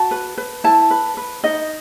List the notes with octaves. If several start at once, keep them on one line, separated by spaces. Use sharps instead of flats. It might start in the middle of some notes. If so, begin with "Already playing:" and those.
Already playing: F#4 A5
B4
B4
E4 A5
B4
B4
D#4 D#5